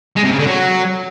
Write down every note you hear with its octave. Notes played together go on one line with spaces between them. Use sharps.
G#3
C3
C#3
D3
F#3